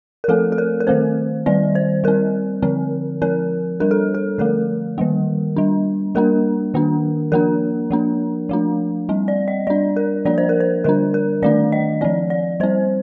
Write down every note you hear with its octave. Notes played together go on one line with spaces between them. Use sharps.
A#4
F3 A3 C4 A4
A4
A#4
A#4
D#3 A3 C4 C5
D#3 G3 C4 D5
C5
G3 C4 A#4
D3 F3 C4
F3 C4 A#4
G3 D4 A#4
A4
A4
D3 F3 A3 A#4
D#3 G3 A#3
G3 D4
G3 A#3 D4 A#4
D#3 A#3 D4
F3 A#3 D4 A#4
F3 A#3 D4
F3 A3 D4
G3 C4
D5
D#5
G3 D4 D5
A#4
F3 A#3 D4 D5
C5
A#4
C5
D3 G3 D4 A#4
A#4
D#3 A3 D4 D5
D#5
F3 C4 D5
D5
G3 C4 C5